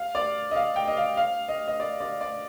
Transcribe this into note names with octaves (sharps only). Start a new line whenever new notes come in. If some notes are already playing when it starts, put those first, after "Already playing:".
Already playing: F5
D5
D#5
F5
G5
D#5
F5
F5
D#5
D#5
D5
D5
D5